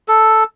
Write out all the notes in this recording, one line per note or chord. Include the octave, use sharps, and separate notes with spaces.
A4